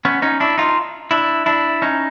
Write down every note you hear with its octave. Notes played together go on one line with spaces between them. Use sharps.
B3 C#4
C#4 D#4
D4 E4
D#4 F4
D4 E4
D4 E4
C#4 D#4